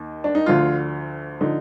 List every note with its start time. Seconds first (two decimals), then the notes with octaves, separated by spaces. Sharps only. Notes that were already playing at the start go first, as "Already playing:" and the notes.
Already playing: D#2 D#3
0.24 D4
0.35 D#4
0.46 D2 D3 F3 F4
1.41 D3 F3 D#4